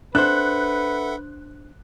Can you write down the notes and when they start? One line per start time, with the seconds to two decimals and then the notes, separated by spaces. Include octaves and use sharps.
0.15 D4 A4 B4 C5 E5 F#5 F#6